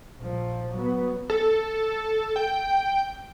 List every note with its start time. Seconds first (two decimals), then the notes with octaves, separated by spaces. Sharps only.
0.19 A#1 F3
0.73 F#3 B3
1.30 A4
2.36 G5